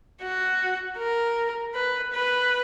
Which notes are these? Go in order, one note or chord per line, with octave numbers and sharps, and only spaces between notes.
F#4
A#4
B4
B4